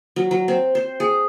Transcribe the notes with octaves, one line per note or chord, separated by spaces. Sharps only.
F#3
F#3
C4
C5
G#4